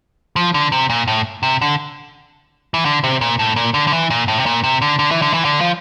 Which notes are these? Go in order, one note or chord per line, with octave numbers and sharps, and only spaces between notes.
F3
D3
C3
A#2
A2
C3
D3
E3
D3
C3
A#2
A2
A#2
D3
D3
E3
A#2
A2
C3
A#2
C3
D3
D3
E3
D3
E3
D3
F3